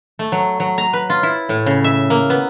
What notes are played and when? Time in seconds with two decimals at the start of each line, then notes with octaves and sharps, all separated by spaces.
0.19 A3
0.32 F#3
0.60 F#3
0.78 A#5
0.93 B4
1.10 F4
1.23 E4
1.49 A2
1.66 C#3
1.84 E5
2.10 A#3
2.30 B3